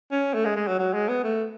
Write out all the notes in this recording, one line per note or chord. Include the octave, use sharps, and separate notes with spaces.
C#4
A3
G#3
G#3
F#3
F#3
G#3
B3
A3